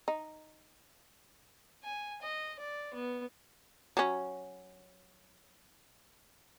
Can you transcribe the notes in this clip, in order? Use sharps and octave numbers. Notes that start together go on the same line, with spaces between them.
D#4
G#5
D#5
D5
B3
F#3 C#4